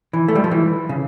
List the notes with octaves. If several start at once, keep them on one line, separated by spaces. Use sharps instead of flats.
E3
A3
G3
F3
E3
C#3